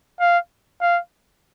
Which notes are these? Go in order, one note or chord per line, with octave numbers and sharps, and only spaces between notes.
F5
F5